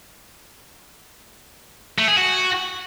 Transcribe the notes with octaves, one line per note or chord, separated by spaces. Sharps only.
A3
G#4
F#4